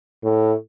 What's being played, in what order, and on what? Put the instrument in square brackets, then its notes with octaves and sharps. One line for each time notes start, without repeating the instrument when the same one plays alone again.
[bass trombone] A2